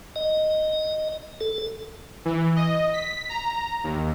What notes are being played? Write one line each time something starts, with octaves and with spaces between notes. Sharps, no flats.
D#5
A4
E3
D#5
B6
A#5
D#2